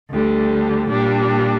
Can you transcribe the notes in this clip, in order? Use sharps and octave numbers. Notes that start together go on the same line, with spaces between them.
D2 D3 G3
A#2 G3 D4